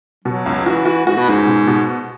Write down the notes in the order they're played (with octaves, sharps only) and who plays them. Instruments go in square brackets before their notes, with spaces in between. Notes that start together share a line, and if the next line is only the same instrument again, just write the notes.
[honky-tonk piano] B2 [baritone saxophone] F#3
[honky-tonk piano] C#2
[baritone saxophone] E3 [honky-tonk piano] F#4
[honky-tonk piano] F#4
[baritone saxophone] G#2 [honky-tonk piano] F#4
[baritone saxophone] B2
[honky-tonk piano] C#2 [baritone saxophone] G#2
[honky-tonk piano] B2
B2